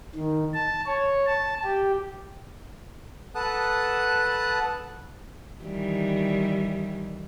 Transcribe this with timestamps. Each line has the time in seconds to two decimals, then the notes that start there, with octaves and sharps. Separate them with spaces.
0.15 D#3
0.54 A5
0.86 C#5
1.26 A5
1.64 G4
3.35 A4 B4 F#5 A5 D#6 F#6
5.63 D#3 E3 G3